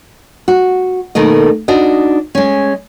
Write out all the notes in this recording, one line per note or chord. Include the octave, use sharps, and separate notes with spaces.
F#4
B2 D#3 A3 A#3 D#5
D4 D#4 F#4 D#5
G#3 C#4